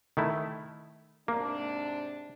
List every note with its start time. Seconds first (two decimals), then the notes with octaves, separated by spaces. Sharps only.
0.17 D#3 A3 E4
1.28 G#2 C3 A#3 D4